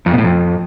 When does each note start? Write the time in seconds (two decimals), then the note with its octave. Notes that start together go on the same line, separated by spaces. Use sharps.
0.06 F2
0.12 B2
0.18 A2
0.24 F2